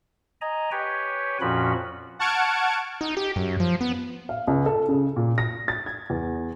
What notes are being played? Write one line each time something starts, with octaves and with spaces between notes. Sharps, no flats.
D#5 G#5 A#5
G4 B4 C#5 G5 G#5
F2 A#2 F3 C#4 F#4 B5
F#5 A5 C#6 F6 G#6 D7
D#4
G4
F#2
F3
B3
F5
C#2
A4
C#3
A#2
A#6
A6
G#6
E2